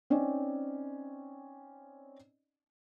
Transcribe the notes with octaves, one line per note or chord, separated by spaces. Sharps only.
C4 C#4 D#4 D5 D#5